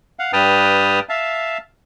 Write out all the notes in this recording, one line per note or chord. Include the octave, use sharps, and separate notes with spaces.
F5 F#5
G2 B4 G5 A5 D#6 F6
E5 F5 A5